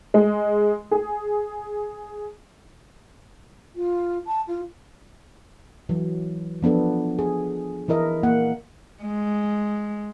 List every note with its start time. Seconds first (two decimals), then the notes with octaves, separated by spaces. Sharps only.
0.14 G#3
0.91 G#4
3.76 F4
4.26 A5
4.47 F4
5.89 E3 F#3
6.62 F3 B3 D4 A4
7.19 G#4
7.88 E3 E4 A#4 D#5 E5
8.23 A#3 F#5
9.03 G#3